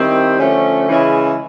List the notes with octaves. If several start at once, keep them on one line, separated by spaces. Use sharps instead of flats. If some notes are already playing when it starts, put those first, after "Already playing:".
Already playing: D#3 G3 C4 E4
D3 F3 A3 C#4
C#3 E3 G#3 C#4 E4